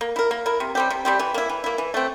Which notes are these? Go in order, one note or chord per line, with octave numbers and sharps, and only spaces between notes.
A#3
E4 A#4
A#3
E4 A#4
C3
G3 C4 G4
C3
G3 C4 G4
E3
A#3 E4
E3
A#3 E4
E3
A3 C4